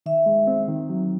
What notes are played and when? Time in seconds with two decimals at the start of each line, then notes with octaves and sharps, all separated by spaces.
0.06 D#3 E5
0.26 G#3
0.47 C4
0.68 D#3
0.89 F#3